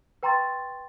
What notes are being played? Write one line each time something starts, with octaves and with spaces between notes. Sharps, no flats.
B4 G5 A#5 C6 C#6 A6